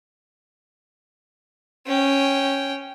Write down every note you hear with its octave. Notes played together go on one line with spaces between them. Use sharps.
C#4 G5